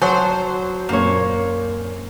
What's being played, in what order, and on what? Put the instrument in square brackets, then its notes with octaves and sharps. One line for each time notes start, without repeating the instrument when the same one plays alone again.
[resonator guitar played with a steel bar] F#3 [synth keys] C5 [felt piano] A5 D#6
[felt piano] F#2 A#2 C4 [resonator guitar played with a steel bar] A#3 C#5